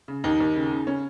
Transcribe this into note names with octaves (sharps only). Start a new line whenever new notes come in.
C#3
D#2 D#4
D#2
C#3
C#3
C#4